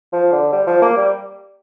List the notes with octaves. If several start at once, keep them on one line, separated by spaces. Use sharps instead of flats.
F3
D3
G3
F3
A#3
G3